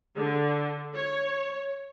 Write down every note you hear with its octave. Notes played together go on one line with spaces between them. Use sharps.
D3
C#5